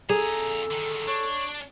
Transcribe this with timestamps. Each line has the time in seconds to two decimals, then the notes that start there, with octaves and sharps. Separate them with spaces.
0.09 F2 G#4 A4 A#5
0.71 D3 D#3
1.08 D4 C#5